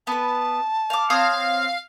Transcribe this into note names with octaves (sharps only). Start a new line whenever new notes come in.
B3 B4 A5
F5 D6
C4 C#5 F5 D#6